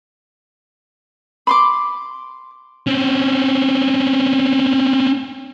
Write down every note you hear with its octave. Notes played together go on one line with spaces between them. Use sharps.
B5 C6 D6
C4 C#4